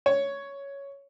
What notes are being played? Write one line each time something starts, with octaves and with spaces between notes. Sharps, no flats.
C#5